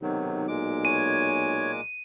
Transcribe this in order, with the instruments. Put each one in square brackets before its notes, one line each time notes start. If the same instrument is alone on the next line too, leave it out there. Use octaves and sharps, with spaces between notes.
[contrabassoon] B1 [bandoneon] C3 D#3 F#3
[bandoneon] A#2 G#3 D6
[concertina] C#5 G#5 [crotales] D#7